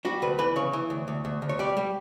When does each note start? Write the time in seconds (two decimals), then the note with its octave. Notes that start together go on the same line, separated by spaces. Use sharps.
0.05 G3 F#4
0.22 D2 B4
0.39 E3 B4
0.56 C#3 C#5
0.73 E3
0.90 D2
1.08 D2
1.25 D2
1.42 D2
1.49 C#5
1.59 G3 D5
1.77 G3